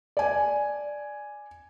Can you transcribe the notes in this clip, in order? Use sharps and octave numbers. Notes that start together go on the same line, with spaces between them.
D5 G#5